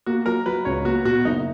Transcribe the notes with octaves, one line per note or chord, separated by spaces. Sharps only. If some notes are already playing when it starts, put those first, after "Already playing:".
A#3 F#4
F#3 A#4
F#3 B4
C#2 C#5
A#3 F#4
B2 F#4
F#1 D#4